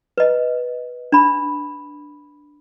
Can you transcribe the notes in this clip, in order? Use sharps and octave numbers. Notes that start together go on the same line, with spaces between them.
B4 D#5
D4 B5